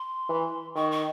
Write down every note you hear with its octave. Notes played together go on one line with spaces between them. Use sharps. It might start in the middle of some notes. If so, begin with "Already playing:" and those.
Already playing: C6
E3
D#3 C#6
C#6